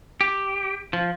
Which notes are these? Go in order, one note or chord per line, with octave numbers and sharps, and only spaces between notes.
G4
F3